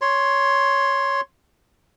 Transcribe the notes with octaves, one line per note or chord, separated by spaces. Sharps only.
C#5 C6